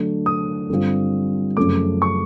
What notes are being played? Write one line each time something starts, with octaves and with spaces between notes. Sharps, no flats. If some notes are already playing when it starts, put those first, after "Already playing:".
Already playing: D3 F#3 A3 D4
D#6
G2 D3 G3 C4 F4
F#2 C#3 F3 A3 D6
C#6